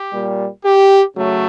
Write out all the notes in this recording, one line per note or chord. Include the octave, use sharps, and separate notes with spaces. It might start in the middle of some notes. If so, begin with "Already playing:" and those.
Already playing: G4
A#2 G3
G4
C#3 F#3 A3